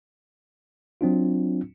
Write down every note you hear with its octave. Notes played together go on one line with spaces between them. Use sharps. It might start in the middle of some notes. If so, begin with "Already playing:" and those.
F#3 C4 D4 F4